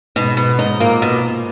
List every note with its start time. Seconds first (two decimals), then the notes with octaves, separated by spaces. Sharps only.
0.16 G#2 B2
0.37 B2
0.59 G#2 D#4
0.80 A#2 A#3
1.02 B2